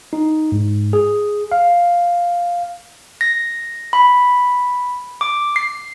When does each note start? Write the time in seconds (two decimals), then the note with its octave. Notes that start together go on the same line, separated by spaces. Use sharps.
0.13 D#4
0.52 G#2
0.93 G#4
1.52 F5
3.21 A#6
3.93 B5
5.21 D6
5.56 C7